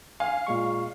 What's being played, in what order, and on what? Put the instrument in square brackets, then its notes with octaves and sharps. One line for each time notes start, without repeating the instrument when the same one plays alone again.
[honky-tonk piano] F5 [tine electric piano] G#5
[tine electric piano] A#2 G#3 C#6